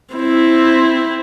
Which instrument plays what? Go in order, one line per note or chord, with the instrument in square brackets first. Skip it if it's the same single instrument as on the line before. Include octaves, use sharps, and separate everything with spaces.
[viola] C4 E4